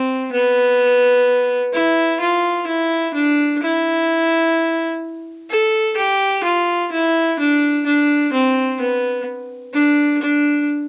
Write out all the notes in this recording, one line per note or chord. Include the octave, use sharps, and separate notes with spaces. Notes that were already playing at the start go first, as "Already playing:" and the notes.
Already playing: C4
B3
E4
F4
E4
D4
E4
A4
G4
F4
E4
D4
D4
C4
B3
D4
D4